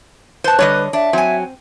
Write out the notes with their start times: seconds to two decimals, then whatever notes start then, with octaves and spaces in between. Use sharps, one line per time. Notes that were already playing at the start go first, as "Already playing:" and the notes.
0.44 B4 C5 A5
0.59 D3 G3 C#5 D#5
0.93 D4 E5
1.13 F#3 C4 G#5